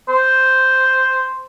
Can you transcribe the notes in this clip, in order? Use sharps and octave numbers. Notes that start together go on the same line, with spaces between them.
C5